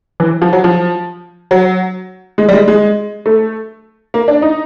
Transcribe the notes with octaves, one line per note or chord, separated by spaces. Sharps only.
E3
F3
F#3
F3
F#3
G#3
G3
G#3
G#3
A3
A#3
D4
D#4